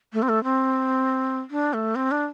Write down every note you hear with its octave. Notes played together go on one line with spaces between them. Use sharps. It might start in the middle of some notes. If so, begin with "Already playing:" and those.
A3
C4
A3
C4
D4
A3
C4
D4